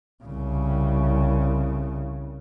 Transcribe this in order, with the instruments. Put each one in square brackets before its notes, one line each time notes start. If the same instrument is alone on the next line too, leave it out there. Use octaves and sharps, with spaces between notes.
[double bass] C2 C#3